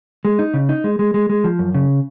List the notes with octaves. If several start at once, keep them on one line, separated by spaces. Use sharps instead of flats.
G#3
D#4
C#3
D#4
G#3
G#3
G#3
G#3
F3
F#2
C#3